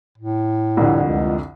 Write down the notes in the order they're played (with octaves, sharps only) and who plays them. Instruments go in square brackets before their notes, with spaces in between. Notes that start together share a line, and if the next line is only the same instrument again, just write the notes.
[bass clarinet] A2
[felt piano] C2 F2 D3
[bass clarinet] C#2